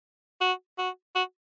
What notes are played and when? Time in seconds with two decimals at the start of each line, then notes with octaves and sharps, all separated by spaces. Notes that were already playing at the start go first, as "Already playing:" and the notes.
0.41 F#4
0.78 F#4
1.15 F#4